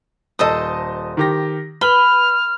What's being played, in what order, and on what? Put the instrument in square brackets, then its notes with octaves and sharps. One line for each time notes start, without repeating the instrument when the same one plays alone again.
[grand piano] D#1 D#5 A5 [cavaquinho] A4 C5 D#6
[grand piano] D#3 G4 A#6
[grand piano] B4 G7 [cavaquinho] B5 [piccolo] F6